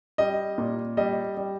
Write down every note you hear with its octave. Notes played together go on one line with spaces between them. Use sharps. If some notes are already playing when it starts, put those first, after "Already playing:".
G3 D#5
A#2
G3 D#5
G3